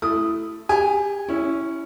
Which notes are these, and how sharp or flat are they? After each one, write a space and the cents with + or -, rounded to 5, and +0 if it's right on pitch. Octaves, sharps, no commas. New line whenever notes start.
A3 +0 E4 +10 D#6 +0
G4 +35 G#5 +0
C#4 +0 E4 +0 C#5 +30